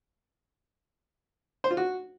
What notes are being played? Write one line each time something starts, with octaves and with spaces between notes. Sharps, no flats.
C5
F4
F#4